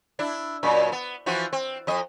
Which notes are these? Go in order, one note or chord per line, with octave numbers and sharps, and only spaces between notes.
D4 E4
F#2 A#2
B3
E3 F3 F#4
C4
F2 D#5